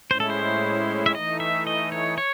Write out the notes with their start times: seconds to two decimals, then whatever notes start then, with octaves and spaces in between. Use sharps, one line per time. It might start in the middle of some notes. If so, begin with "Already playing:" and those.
0.11 A2 G#3 C#4 E4 C5
0.20 A4
0.30 C5
1.06 E5
1.14 E3 A3 D#4 D#5
1.40 E5
1.67 D#5
1.92 C#5
2.18 C#5